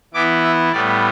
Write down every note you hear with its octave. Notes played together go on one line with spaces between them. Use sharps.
E3 B3 E4 D6
E5
A2 G3 B3 D5